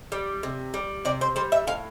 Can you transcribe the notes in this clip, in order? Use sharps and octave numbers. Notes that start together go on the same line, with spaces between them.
G3
C3
G3
C3 D5
C5
G3 C5
E5
A2 F5